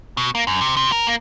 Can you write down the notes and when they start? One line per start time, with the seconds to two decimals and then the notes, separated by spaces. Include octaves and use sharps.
0.17 B2
0.35 A#3
0.47 F#2
0.61 C3
0.77 C3
0.92 A#4
1.07 A#3